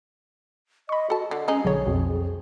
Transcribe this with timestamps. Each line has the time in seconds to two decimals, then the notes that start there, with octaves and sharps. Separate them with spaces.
0.89 D#5 B5 C#6
1.10 F#4 A4 A5
1.31 D3 A4
1.48 G#3 C#4 D#4 G#5 C7
1.65 B1 D3 G#4 C#5
1.86 B1 F2 B2